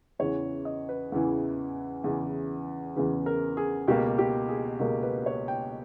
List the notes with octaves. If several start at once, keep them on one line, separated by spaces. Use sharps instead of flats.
E2 C#3 E3 C#5
D#5
B4
E2 C#3 E3
E2 C#3 E3
E2 C#3 E3 B4
A#4
G#4
C#2 B2 A#3 G4
G4
G#4
C#2 B2 A#3 A#4
B4
C#5
G5